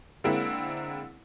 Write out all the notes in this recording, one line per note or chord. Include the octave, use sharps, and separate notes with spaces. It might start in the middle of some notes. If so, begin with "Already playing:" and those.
D3 G#3 A#3 C4 E4